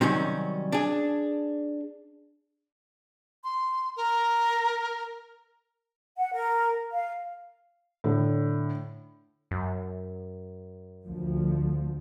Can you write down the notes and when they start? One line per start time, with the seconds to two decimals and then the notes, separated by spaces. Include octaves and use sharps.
0.01 C3 D#3 F#3 G3 C#4
0.72 D4 G#4
3.44 C6
3.96 A#4
6.17 F#5
6.33 A#4
6.92 F5
8.04 A2 D3
9.51 F#2
11.04 D2 F3